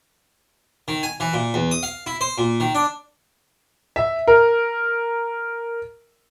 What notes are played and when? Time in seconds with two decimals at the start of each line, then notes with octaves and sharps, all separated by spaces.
0.88 D#3
1.03 G#5
1.20 E3
1.33 A#2
1.54 E2
1.71 D#6
1.83 F5
2.06 E4
2.21 C5
2.38 A#2
2.60 D#3
2.75 D4
3.96 E5
4.27 A#4